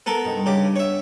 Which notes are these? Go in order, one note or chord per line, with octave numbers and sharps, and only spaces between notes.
B3 A4 A#4
G2 C3 D#4
C#3 G4
B3 C#5 E5